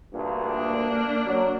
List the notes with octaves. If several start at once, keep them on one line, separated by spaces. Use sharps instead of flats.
D2 G2 A#2
A#3 D4
F#3